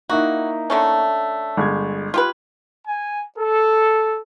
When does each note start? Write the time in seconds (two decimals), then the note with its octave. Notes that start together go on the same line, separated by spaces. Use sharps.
0.10 A#3 D#4 E4 F#4
0.70 D3 A3 C#4
1.57 G1 G#3 G#6
2.14 F4 G4 B4
2.88 G#5
3.38 A4